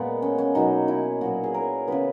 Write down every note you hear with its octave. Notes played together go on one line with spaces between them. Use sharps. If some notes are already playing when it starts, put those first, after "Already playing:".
Already playing: A#2 G#3 B3
C#4
C#4
B2 F#3 A#3 D#4
E4
A#2 F#3 B3 F#4
G#4
A#4
C#3 E3 B3 B4